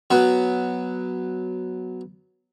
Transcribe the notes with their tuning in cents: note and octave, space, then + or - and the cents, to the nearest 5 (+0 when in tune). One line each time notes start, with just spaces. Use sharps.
F#3 +0 B3 +0 B4 +0